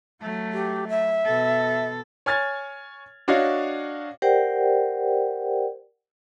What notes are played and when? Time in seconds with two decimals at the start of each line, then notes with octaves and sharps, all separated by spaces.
0.22 F#3 A3
0.53 G4
0.88 E5
1.25 B2 A4
2.26 C#5 G#5 F6 G#6 A6
3.28 D4 F#4 C#5 D#5 F5
4.22 G4 A#4 C5 D5 F#5 G5